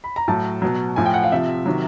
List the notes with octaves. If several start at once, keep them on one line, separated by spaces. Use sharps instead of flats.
B5
A#5
A2 F#3 A5
B2 F#3
A2 F3 G#5
G5
F#5
F5
C3 F3 E5
C3 D#3 F#3